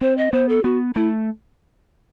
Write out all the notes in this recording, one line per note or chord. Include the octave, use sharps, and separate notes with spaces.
C4 C5
D#5
B3 C5
A4
B3 F#4
A3 E4